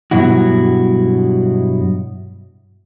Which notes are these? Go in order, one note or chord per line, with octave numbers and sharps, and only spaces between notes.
G2 B2 F#3 E4 F#4